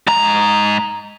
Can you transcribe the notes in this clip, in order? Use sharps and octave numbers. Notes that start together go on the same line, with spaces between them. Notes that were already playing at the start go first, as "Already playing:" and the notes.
G#2 A#5